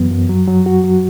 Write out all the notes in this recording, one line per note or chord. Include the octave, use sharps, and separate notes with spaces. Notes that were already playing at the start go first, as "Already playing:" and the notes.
Already playing: F#2 E3 F#3 B3
F#2
F#3
F#3
F#4
F#3